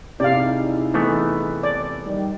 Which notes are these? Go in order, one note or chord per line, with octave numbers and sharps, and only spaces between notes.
C3 D#4 E4 G#4 D5 F5
E3 A3 B3
D5
D#3 G3